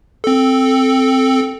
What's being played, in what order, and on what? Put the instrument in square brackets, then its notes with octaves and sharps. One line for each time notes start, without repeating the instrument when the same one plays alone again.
[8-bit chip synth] C4 A4